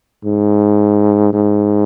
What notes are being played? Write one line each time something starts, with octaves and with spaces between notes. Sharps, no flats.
G#2
G#2